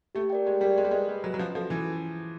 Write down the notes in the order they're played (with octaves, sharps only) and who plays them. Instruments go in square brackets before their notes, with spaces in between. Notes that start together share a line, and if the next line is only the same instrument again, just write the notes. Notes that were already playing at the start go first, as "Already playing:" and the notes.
[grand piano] A3 [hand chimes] G4
[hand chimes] A#4 D5 G5
[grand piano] G#3 [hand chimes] G4
[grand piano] G3 [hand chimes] A#4 D5 G5
[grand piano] G#3 [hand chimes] G#4
[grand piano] G3
[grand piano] G#3 [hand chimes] B4 D#5
[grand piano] G3 [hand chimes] G#4
[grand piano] F#3 [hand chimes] B4
[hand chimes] D#5
[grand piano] F#3
[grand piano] F3 [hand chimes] C#4
[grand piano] F3 [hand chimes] F#4 A4
[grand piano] E3 [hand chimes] C#4